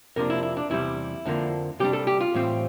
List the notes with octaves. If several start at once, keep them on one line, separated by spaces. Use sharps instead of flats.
F2 C3 F3 A#3 D4 A#4
E4
E4
D4
E2 C3 G3 E4
F2 D3 F3 A#3 D4
C3 G3 D4 G4
A4
G4
F4
A2 E3 G3 C4